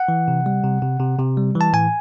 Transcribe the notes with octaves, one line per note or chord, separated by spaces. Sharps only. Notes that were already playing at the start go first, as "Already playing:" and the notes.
Already playing: F#5
E3
C3
G3
C3
C3
C3
C3
G3
E3
A5
A2 G#5